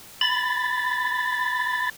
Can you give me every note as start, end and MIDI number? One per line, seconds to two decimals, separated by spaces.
0.21 1.90 83
0.21 1.90 93